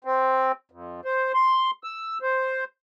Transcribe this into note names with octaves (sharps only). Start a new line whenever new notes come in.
C4
F2
C5
C6
E6
C5